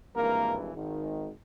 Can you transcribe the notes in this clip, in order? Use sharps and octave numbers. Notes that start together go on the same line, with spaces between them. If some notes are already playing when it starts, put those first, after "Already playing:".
G#1 G2 E3 A#3 A#4
G#1 G#2 D#3